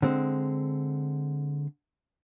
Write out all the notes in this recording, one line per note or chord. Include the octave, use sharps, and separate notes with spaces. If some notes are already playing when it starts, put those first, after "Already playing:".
D3 G#3 C4